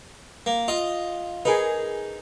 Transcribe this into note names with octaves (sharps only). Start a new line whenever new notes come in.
A#3
F4 D#5
D#4 G#4 A#4 B4